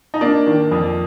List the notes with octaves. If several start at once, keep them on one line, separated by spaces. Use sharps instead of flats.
D#4
A#3 D4
D#3
F2